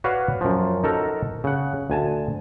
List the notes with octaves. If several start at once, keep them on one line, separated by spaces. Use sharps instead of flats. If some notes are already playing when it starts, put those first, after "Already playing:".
F#4 B4 C#5 D5 F5 F#5
F#2 F3
D#4 F#4 A4 A#4
C#3 F#5
D2 G#5 A5